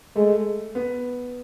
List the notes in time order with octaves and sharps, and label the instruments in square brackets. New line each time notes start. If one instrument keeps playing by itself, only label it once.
[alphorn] G#3 [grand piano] A3
[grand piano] B3